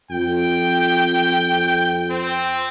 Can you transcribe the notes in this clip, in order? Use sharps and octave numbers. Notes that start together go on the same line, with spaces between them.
F2 G5
C4